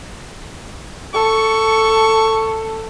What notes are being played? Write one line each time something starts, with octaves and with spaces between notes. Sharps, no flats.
A4 C#6